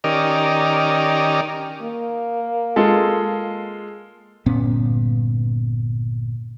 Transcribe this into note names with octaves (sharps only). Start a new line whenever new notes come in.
D#3 C#4 G4 A#4 D5 D#5
A#3
G#3 F4 A4
G1 A#2 B3 C#4